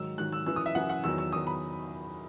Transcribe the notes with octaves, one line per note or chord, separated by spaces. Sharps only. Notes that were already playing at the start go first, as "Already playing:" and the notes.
Already playing: G#2 D#3 F#3 E6
G#2 D#3 F#3 F#6
E6
F#2 E3 E6
D#6
E5
F#2 E3 F#5
F#5
E2 D#3 F#3 E6
E6
E2 D#3 F#3 D#6
B5